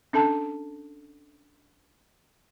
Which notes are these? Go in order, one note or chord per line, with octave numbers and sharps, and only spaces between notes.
C#4 D4 A4 A5